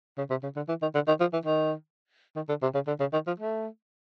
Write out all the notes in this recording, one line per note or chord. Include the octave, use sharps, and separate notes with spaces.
C#3
C3
C#3
D3
E3
D#3
D3
D#3
F3
E3
D#3
D#3
D3
C3
C#3
D3
C#3
D#3
F3
A3